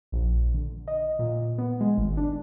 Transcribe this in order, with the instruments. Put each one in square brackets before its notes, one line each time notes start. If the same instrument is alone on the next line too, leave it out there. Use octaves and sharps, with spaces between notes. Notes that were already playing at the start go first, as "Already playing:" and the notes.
[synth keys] A#1
D3
D#5
A#2
B3
G#3
G#1
D4